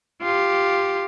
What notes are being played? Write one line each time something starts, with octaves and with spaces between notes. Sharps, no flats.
F4 G4